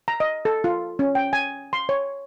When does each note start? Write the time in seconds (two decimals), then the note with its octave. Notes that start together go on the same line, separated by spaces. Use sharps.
0.08 A#5
0.20 D#5
0.45 A4
0.64 F4
0.99 C#4
1.15 G5
1.33 G#5
1.73 C6
1.89 C#5